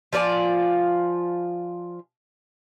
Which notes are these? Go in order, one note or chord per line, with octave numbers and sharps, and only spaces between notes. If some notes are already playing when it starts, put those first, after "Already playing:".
F3 F4 D5 G#5